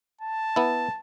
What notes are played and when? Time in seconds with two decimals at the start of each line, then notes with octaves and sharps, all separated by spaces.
0.21 A5
0.56 B3 E4